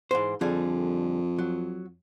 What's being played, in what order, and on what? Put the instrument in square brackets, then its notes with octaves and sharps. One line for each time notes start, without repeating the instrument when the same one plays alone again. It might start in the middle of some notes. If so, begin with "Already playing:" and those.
[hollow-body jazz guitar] G#2 E3 C5
[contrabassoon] F2 [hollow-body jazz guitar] D3 G3 G#4
[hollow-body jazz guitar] F#3